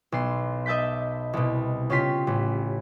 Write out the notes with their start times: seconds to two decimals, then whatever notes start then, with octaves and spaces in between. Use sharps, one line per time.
0.12 B1 C6
0.66 D#5 E5 A5 G6 B6
1.33 C2 B2
1.90 C#3 C#4 F4 G4 C6 B6
2.27 A1